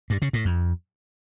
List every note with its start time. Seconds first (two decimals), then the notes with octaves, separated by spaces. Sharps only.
0.10 G2
0.22 C#3
0.33 A2
0.45 F2